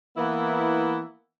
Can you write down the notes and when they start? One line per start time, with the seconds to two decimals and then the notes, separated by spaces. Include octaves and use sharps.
0.16 E3 A#3 B3 E4